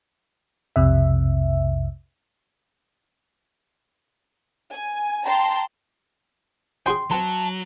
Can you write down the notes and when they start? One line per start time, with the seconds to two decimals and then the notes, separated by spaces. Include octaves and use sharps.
0.76 B1 F2 C3 E5
4.73 G#5
5.26 G5 A5 A#5 C6
6.86 C#4 F#4 G#4 G5 C6
7.11 F#3 C4 B4 C5 A5